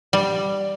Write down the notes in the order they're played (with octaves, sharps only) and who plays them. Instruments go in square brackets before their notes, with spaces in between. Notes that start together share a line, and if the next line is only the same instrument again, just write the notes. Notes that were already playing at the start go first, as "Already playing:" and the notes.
[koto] G3